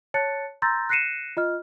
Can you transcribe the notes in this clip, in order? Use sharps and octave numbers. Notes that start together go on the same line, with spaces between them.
C#5 A5 F#6 A6 C#7
A#5 C6 E6 G6 A6 A#6
F#6 A#6 C7 C#7 D#7 E7
F4 D#5 F6